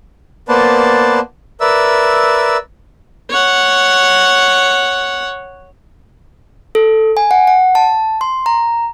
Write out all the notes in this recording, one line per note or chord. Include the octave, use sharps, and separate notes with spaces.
A#3 B3 B4 C5 D5 A5
A#4 B4 D5 E5 E6
C#5 F#5
A4
G#5
F#5
F#5
A5
C6
A#5